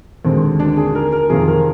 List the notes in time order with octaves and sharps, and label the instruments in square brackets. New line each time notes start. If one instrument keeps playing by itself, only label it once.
[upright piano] D#2 D3 G#3 C4
D4
G#4
A#4
A#4
F2 C3 D#3 A#3 G#4
A#4